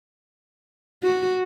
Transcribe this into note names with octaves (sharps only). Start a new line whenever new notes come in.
F#4